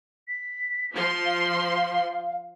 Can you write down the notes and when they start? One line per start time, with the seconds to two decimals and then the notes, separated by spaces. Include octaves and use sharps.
0.28 B6
0.93 F3 C6
1.25 F5